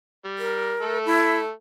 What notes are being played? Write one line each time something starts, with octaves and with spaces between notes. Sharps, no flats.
G3
A#4
A3 A4
E4